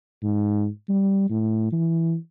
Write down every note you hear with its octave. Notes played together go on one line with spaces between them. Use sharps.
G#2
G3
A2
E3